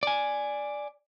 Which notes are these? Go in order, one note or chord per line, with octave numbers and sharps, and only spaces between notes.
D5 G#5